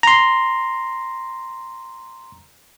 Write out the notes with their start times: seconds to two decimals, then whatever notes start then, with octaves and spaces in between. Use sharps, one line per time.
0.03 A#5 C6